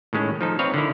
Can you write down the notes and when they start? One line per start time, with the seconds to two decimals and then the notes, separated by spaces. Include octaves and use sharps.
0.13 A2 D#3 G#3 C#4
0.41 F3 D#4 A4
0.59 C4 B4 C#5 D#5 F5
0.74 D3 D#3 E4